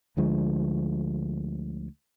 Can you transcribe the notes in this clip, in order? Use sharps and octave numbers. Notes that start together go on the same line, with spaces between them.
D2 D3 F3 G#3